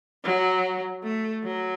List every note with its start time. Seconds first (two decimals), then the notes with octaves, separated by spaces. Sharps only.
0.24 F#3
1.03 A3
1.43 F#3